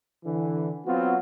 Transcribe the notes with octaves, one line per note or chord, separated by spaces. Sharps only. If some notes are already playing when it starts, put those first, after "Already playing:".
D3 E3
F#3 B3 C4 F4 F#4